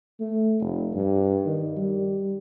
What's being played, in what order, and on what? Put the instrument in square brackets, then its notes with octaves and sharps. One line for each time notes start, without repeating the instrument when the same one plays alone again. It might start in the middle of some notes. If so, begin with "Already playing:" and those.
[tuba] A3
F1
G2
D#3
G3